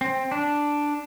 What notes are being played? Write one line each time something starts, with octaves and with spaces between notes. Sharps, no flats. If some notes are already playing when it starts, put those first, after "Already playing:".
C4
D4